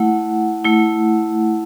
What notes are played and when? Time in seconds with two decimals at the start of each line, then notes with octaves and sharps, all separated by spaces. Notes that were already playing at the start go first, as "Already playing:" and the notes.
Already playing: A3 E4 F#5
0.64 A3 E4